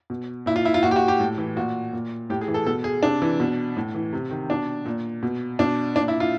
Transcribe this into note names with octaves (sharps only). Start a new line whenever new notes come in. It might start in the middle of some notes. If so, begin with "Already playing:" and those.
B2
A#2 E4
F4
E4
F4
A#2 F#4
G4
F#4
G4
A2
E3
A#2 F#4
A#2
A2 G4
G#4
E3
A4
B2 A4
G#4
C3 D4
E3
B2
A2
E3
C3
D#3
B2 D4
A#2
B2
B2 D4
A#2 D4
E4
F4